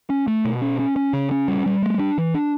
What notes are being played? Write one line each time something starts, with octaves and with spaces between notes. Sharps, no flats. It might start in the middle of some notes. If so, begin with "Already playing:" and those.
C#4
A3
B2
C#4
C#4
C#4
C#3
C#4
G3
G3
A3
D4
E3
D4